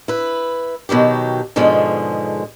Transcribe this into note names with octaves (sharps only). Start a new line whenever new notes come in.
E4 B4
B2 D#3 F#3 G4
G#2 B2 D3 F3 G#3